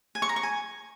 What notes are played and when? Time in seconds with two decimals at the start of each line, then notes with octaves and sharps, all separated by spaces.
0.15 G#5
0.22 C#6
0.29 A#5
0.36 C#6
0.43 G#5